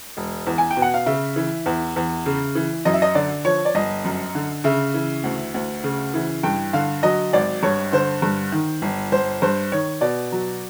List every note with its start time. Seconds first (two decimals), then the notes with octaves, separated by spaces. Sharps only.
0.17 E1
0.47 E2
0.58 G#5
0.71 G5
0.77 B2
0.82 F#5
0.94 F5
1.06 C#3 E5
1.36 E3
1.66 E2
1.96 E2
2.26 C#3
2.55 E3
2.85 F#2 D#5
2.93 E5
3.02 D#5
3.15 D3 D5
3.45 F3 C#5
3.65 D5
3.75 G1 D#5
4.05 F#2
4.35 D3
4.64 C#3 E5
4.94 E3
5.24 D2
5.54 D2
5.84 C#3
6.14 E3
6.43 G2 G5
6.73 D3 F5
7.03 F#3 D#5
7.33 G#1 D5
7.63 G2 C#5
7.92 D3 C5
8.22 G2
8.52 D#3
8.82 G1
9.12 G1 C5
9.42 G2 C5
9.72 D#3 C#5
10.01 B2 D5
10.32 F#3